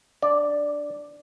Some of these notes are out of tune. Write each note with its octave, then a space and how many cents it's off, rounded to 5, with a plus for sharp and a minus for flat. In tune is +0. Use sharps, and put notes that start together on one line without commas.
D4 +0 D5 +0